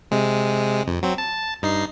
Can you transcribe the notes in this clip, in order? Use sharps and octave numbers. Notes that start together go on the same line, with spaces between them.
C3 G#3
F2
F#3 C4
A5
G2 D#4 C7